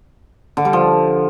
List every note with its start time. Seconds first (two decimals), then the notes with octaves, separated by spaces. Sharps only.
0.57 D3
0.65 G3
0.73 F3